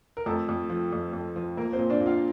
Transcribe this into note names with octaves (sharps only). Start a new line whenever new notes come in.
A#4
F2 A3 A4
F2
F3
F2
F2
F3
F3 A#3 A#4
C4 C5
A#2
D4 D5
A#2
F4 F5